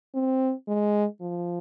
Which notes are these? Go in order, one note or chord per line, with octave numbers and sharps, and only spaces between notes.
C4
G#3
F3